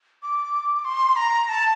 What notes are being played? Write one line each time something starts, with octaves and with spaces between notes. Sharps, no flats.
D6
C6
A#5
A5